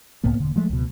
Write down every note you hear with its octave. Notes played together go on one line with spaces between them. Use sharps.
C#2 A2 A#3 B3
E1 D3
F3 G#3 A3
C#2 B2